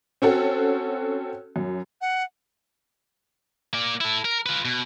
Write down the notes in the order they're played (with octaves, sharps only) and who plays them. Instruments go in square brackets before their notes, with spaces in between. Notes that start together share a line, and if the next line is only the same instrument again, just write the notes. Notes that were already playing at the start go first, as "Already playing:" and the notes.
[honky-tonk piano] C4 C#4 F#4 A4
F#2
[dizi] F#5
[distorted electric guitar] A#3 D5
E4 A4
A#4
F4 B4
B2